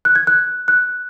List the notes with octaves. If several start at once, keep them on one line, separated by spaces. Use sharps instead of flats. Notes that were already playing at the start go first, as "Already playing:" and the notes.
F#6
G#6
F#6
F#6